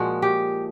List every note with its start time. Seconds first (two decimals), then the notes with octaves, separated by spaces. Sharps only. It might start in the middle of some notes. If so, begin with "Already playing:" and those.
Already playing: A#2 F3 G#3 F#4
0.22 G4